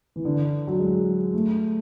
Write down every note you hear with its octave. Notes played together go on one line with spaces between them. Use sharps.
E3
D3
F#3
G#3
A3